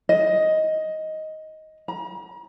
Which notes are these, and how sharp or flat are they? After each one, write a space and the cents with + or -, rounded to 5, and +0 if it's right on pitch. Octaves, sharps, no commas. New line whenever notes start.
D#5 +10
A#5 +40